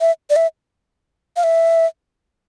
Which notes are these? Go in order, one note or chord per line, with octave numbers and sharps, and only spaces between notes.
E5
D5
E5
F5
E5